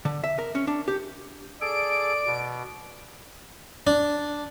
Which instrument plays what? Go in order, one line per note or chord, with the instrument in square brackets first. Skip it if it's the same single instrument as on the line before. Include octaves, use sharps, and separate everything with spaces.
[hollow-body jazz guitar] D3
E5
A#4
C#4
D4
G4
[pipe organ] G#4 A4 [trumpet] D5 [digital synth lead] D7
[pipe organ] B2
[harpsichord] D4